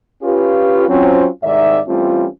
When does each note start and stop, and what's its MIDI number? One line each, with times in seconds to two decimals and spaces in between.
0.23 0.86 61
0.23 0.86 65
0.23 0.86 67
0.23 0.86 71
0.88 1.27 54
0.88 1.27 60
0.88 1.27 61
0.88 1.27 65
1.43 1.80 36
1.43 1.80 44
1.43 1.80 51
1.43 1.80 74
1.43 1.80 76
1.86 2.26 52
1.86 2.26 55
1.86 2.26 57
1.86 2.26 60
1.86 2.26 61
1.86 2.26 65